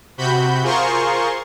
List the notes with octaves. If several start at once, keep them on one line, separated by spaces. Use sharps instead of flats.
C3 F#4 B5 G6
F4 G#4 A#4 C5 C6 C#6